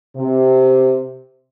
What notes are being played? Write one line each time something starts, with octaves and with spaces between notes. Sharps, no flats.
C3